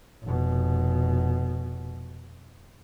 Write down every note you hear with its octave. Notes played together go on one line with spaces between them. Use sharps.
F1 B2